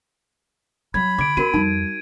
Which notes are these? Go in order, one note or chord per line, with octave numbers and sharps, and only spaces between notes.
F#3 B5 G#6
D3 D6 G#6 D7
C4 F#4 A#4 D#7
F2 G3 D#4